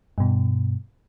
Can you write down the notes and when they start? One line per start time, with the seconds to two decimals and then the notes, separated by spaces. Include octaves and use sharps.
0.18 G2 B2